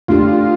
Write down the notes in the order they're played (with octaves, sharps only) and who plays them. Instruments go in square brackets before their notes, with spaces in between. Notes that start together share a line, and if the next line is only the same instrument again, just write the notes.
[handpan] A3 D4 G4 [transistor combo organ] F4